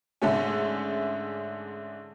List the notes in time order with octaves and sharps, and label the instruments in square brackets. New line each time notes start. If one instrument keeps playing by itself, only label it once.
[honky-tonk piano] G#2 D3 A3 C#4